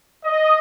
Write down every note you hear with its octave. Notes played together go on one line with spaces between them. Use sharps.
D#5